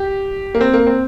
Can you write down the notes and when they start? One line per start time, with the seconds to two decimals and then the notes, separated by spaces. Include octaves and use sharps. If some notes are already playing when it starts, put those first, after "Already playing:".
Already playing: G4
0.55 A#3
0.61 C4
0.74 A#3
0.87 C4